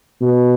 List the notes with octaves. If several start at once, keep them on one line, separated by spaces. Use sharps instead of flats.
B2